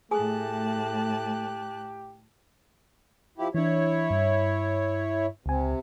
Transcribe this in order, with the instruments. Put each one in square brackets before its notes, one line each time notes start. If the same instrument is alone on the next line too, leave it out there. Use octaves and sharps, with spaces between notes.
[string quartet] A2 A5 F#6 [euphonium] A3 [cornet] G4 [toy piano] G#4 G#5 D#6
[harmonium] F3 E4 G4
[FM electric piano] E3 D4 [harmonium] E4 C#5
[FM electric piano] G2
[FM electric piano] C#2 G#5 [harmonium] C3